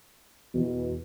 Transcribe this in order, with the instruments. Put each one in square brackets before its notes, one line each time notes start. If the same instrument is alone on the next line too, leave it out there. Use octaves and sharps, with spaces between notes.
[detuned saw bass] E2 [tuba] B2